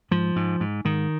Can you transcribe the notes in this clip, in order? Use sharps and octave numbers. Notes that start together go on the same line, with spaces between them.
G#2 F3
G#2
G#2
G#2 D#3